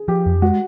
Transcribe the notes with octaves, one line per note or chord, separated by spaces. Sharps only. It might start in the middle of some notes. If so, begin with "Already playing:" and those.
Already playing: G#4
F3 G4
F2
G#3 F#4